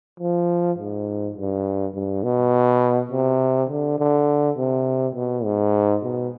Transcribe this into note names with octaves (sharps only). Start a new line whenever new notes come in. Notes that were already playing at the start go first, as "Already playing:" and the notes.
F3
G#2
G2
G2
B2
C3
D3
D3
C3
B2
G#2
B2